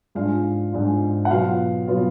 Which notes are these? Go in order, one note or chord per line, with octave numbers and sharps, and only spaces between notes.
G#2 G#3 D4 F4 F5
G#2 G#3 D4 F4
F#5
B2 F#3 B3 F4 F5
B2 F#3 B3 F4